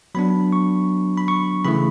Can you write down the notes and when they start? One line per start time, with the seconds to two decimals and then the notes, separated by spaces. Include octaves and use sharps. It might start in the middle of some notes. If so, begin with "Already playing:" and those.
0.15 F#3 B3 D4 B5
0.53 C#6
1.17 B5
1.28 C#6
1.64 C#3 E3 A3 E4 B5